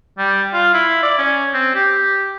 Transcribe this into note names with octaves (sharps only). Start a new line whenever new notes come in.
G3
F4
E4
D5
C#4
C4
G4